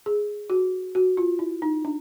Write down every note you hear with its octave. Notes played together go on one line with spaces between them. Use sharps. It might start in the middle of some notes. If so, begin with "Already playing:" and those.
G#4
F#4
F#4
F4
E4
D#4
D4